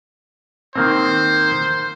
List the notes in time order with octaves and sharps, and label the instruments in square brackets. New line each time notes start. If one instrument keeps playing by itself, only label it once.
[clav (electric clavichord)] D#3 A#3 C4 [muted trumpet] C5